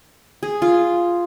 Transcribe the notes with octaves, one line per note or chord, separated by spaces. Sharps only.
G#4
F4